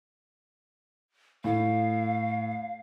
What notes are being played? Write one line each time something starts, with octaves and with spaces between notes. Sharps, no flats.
A2 F5